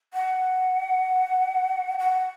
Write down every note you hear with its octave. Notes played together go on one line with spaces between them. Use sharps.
F#5
F#5